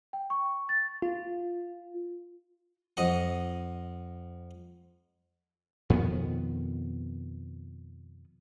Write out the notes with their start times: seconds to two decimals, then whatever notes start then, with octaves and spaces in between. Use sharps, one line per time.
0.13 G5
0.30 C#6
0.69 A6
1.02 F4
2.97 F2 D#5 F#5
5.90 F2 B2 D#3 B3